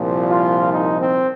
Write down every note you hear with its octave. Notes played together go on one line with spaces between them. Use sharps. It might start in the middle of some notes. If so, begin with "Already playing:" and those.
Already playing: C2 A#2 F3
F4
D#4
C4